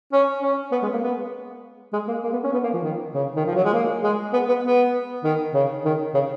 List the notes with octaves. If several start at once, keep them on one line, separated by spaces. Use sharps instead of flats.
C#4
C#4
B3
G#3
A#3
B3
G#3
A#3
A#3
B3
C#4
B3
A#3
F3
D#3
C#3
D#3
F3
F#3
G#3
A#3
G#3
B3
B3
B3
D#3
C#3
D#3
C#3